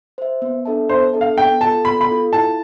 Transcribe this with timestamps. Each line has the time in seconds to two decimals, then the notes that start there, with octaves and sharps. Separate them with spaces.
0.18 C5 E5
0.42 B3
0.65 D4 A4 E5 A5
0.89 B3 C5
1.13 D4 A4 E5 A5
1.21 F5
1.37 B3 G5
1.61 F4 A4 A5
1.85 B3 B5
2.01 B5
2.09 F4 A4
2.32 E4 A5